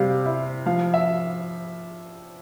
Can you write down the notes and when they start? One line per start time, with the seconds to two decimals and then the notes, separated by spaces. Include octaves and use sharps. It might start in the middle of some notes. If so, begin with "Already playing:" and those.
Already playing: C3 G3 G4 F5
0.26 E4
0.66 F3 F5
0.94 E5